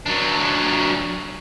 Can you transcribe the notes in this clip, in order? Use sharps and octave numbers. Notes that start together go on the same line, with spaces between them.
F#3 D4